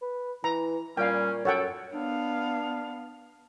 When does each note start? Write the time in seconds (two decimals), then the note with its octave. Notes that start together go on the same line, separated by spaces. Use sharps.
0.02 B4
0.44 E3 A#5
0.97 A#2 G3 C#4 F5 G5
1.45 F#2 A4 C#5 F#5 G5
1.94 B3 D4 F5